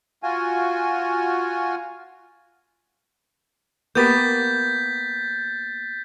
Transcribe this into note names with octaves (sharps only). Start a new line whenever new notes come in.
F4 F#4 G#5
A#3 B3 G4 G6 A6 B6